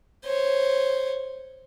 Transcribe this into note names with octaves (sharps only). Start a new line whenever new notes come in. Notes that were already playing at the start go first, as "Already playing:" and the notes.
C5 C#5